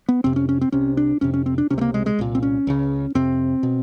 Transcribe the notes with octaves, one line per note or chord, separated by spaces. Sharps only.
B3
F2 C3 C4
C#4
C#4
C4
C2 C3 C#4
D4
F2 C3 C#4
C#4
C4
D4
C#2 C3 A3 C#4
A#3
G#3
G#3
C2 A#2
C4
C#4
C#2 C#3
F2 C3 C4
B2